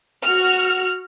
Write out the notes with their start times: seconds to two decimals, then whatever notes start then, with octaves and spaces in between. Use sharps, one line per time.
0.23 F#4 F6